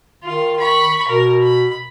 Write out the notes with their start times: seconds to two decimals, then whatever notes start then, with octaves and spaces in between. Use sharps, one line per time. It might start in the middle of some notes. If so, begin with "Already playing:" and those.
0.24 D#3 F4
0.60 B5 C#6
1.08 B2 A#4
1.42 B5